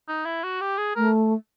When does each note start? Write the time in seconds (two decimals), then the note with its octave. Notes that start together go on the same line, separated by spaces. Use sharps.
0.08 D#4
0.25 E4
0.43 F#4
0.61 G4
0.78 G#4
0.96 A3 A#4